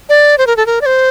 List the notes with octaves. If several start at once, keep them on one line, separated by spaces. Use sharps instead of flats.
D5
C5
A#4
A4
A#4
D5
C5